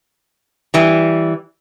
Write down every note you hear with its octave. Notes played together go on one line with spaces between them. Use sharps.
E3 G3